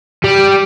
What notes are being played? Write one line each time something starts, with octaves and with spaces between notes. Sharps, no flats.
G3